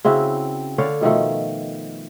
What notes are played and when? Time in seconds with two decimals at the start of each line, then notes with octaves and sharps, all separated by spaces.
0.05 C#3 C4 E4 F#4
0.78 D3 C#5 D5 F5
1.01 B2 D#3 F3 A3